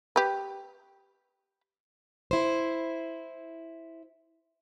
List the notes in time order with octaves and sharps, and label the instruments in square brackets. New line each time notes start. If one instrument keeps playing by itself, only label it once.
[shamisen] G4 B4
[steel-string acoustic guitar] E4 C5